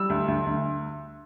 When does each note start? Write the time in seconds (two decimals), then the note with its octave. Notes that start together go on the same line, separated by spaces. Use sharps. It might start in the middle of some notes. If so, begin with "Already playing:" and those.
Already playing: G3 E6
0.09 D2
0.28 D2
0.46 D2